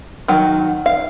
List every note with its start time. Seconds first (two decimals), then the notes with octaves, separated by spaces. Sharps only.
0.28 D#3 F#3
0.86 F5